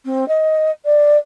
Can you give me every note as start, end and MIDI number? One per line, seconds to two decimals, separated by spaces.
0.05 0.27 60
0.28 0.71 75
0.85 1.17 74